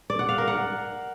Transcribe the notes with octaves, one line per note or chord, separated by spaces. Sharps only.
D5
F#5
F5
A#4
F#5